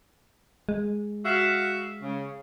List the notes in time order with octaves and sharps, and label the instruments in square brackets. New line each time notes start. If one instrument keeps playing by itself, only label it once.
[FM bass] G#3
[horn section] F#4 E5 F5
C#3